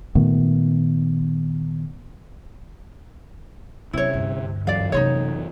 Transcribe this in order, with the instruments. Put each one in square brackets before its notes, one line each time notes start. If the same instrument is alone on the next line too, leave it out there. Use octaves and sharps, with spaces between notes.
[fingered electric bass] A#2 D#3 A3 B3
[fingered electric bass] C3 C#4 [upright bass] F#3 [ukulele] E4 C#5
[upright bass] D2 G2
[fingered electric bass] F#2 E3 F#3 [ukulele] D5 F5
[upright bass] C3 A#3 [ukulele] D#4 F4 C#5